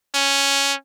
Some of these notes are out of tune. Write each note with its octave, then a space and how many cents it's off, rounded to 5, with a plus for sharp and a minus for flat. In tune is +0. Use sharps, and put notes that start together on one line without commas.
C#4 +0